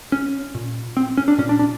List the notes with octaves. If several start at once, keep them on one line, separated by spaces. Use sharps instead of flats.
C#4
A#2
C4
C#4
D4
A#2 C#4
D4
D4